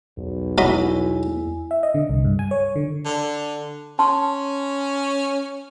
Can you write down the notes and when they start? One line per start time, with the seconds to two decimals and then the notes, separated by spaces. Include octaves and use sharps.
0.17 B1 E2
0.58 F#3 E4 D#5 G#5 B5
1.71 E5
1.83 D#5
1.94 D3
2.09 C2
2.25 G2
2.39 G#5
2.51 C#5
2.76 D3
3.05 D3
3.99 C#4 A5 C6